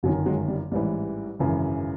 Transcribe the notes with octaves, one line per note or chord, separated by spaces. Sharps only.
G1 F#2 D#3 F#3
F#3 G#3
G3
A1 G#2 E3 G3
G#1 F#2 C#3 E3